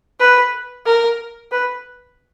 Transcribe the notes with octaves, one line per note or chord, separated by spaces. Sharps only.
B4
A#4
B4